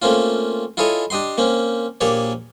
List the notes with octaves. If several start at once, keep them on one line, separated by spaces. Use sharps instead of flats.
A3 A#3 C4 C#4 F4
E4 F4 G#4 A4 C#5 D#5
D4 G4 D#5 G5 C6
A#3 C4 C#4
A#1 A#3 G4 G#4 C#5 D5